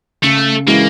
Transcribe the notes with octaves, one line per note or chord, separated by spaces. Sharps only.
C#3 A3
E3 G#3 A#3 C#4 E4